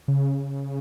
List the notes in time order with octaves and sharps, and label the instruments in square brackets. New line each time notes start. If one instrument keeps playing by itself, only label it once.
[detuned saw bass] C#3